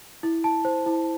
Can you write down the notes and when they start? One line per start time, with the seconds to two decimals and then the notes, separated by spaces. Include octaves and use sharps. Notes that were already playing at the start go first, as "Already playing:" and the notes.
0.23 E4
0.44 A5
0.65 C5
0.86 E4